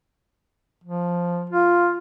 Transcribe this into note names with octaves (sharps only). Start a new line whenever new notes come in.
F3
F4